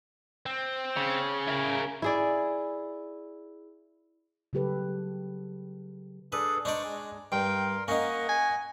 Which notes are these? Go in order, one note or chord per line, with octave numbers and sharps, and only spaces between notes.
C4
C#3
E4 A#4
E4 G#4 D5
C#3 F#3 G4 A4 B4
D4 G#4 A4 B4
D4 D#4 C5 D5 C#6
G#3
G2 A#4 G5 C6
A#3 C#4 D#4 D#5 F#5
G#5